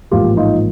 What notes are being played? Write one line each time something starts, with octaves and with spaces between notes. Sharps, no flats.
A1 G#2 F3 A#3 F4 G4
D#4 F4